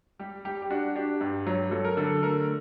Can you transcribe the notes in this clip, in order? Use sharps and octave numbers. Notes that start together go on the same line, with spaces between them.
G3 G4
G3 G4
G4
D4 F#4
D4 G4
G2
F#3
F#3 A4
A#4
D3 A4
A3 A#4